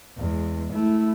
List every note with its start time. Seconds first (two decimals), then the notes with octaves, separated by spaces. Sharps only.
0.18 E2 G#3
0.73 A3 E4